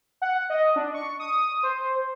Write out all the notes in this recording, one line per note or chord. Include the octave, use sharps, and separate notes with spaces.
F#5
D#5
D4
C#6
D#6
C5